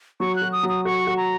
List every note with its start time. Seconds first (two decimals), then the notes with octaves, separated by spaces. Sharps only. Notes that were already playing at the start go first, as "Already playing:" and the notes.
0.20 F#3 C#6
0.36 F#6
0.42 F#4
0.52 D#6
0.63 F#3
0.69 D#6
0.85 F#4 C#6
1.07 F#4
1.17 A#5